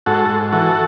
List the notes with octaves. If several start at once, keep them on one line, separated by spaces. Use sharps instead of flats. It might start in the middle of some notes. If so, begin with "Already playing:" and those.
G#2 F#4 A4
G#2
E3 F#4 A4